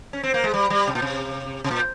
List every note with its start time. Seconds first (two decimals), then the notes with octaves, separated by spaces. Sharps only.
0.13 C#4
0.23 C4
0.34 A#3
0.44 G#3
0.54 G3
0.70 G3
0.88 C3
0.95 A#2
1.02 C3
1.64 C3
1.71 A#2